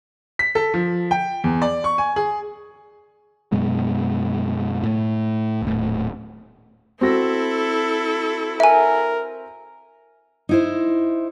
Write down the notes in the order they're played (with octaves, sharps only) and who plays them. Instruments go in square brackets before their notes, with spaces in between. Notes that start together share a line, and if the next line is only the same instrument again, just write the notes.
[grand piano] B6
A4
F3
G5
E2
D5
C#6
G#5
G#4
[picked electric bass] F#2 B2 G#3
A2
D#1 A2
[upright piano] C4 F#4 A#6 [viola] E4 A4
[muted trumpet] A#4 [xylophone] E5 G#5
[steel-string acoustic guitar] D#4 E4 C5